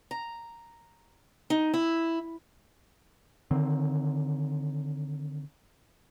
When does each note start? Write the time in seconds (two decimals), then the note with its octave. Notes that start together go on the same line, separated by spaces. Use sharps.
0.11 A#5
1.50 D#4
1.74 E4
3.51 D3 D#3 C4